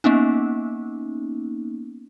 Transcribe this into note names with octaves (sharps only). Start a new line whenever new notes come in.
A#3 B3 C#4 D#4